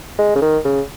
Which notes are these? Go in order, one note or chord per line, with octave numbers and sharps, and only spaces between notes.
G#3
C#3
D#3
C#3